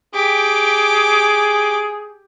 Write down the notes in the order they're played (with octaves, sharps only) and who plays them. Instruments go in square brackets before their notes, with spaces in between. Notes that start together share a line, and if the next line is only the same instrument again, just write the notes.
[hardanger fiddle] G4 D6 [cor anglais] G#4